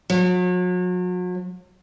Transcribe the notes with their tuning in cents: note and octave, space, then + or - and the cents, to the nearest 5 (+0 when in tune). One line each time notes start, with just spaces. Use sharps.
F#3 -40